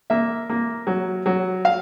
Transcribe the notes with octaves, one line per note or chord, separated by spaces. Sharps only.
A#3 E5
A#3
F#3
F#3
F5